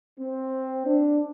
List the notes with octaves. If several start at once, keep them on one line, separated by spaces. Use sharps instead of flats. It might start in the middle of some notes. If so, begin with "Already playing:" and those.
C4
D4